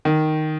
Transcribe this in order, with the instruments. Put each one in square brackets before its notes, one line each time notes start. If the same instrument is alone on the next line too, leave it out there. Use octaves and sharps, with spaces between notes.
[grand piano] D#3